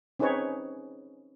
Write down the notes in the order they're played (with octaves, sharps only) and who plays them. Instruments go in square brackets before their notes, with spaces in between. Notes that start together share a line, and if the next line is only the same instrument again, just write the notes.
[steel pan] C4 C#4 D#4 G#4 B4 C#5